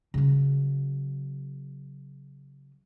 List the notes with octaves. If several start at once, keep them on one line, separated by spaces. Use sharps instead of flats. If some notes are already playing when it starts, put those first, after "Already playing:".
C#3 F#3